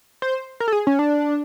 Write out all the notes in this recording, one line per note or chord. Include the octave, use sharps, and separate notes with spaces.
C5
A#4
A4
G#4
C#4
D4